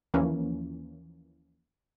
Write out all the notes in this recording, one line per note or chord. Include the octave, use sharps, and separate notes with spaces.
D#2 E3 F3 A#3 C#4